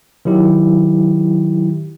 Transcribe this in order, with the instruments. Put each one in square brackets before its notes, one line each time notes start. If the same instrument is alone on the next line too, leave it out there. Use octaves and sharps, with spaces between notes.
[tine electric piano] D#3 F#3 E4 G4